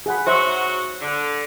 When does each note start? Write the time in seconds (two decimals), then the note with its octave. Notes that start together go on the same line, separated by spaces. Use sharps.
0.06 G#4 F#5 B5
0.27 G#2 F#3 F#4 C5 E5 C#6
1.01 D3